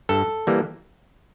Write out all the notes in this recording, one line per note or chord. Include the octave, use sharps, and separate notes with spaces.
G2 A4
E3 G3 A#3